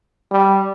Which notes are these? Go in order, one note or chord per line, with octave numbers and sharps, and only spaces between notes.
G3